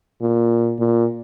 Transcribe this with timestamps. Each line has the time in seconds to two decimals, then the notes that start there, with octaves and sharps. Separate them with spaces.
0.21 A#2
0.79 A#2